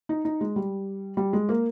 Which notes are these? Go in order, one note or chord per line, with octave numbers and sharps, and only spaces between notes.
D#4
D#4
G#3
G3
G3
G#3
A#3